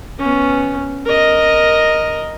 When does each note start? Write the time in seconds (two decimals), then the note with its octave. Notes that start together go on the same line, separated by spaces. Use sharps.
0.19 B3 C#4
1.06 A#4 D#5